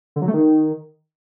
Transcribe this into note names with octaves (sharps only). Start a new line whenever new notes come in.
D3
F#3
A3
D#3